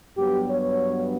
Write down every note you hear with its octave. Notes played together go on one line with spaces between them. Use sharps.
G2 F#3 B3 G4
C#5